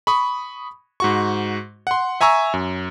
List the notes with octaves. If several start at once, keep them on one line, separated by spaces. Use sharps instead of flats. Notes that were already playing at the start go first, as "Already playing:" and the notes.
B5 C#6 D#6
G#2 F#4 C#6
F#5 C6
E5 G#5 A#5 C#6 E6
F#2